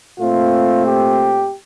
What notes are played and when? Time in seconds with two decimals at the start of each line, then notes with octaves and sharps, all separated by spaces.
0.19 A#2 A3 C4 F4
0.85 G4